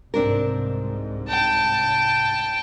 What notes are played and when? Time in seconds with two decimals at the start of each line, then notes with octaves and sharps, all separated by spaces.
0.14 C2 G#2 C4 D4 A#4
1.28 G5 A5